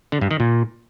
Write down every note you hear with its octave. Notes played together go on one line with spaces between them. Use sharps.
D3
G2
D#3
A#2